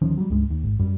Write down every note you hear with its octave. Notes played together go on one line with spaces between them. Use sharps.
D2 D#3 F3 C#4
F#3 G3
C#2 G2 G#3
D#2
G#1
F#2 G3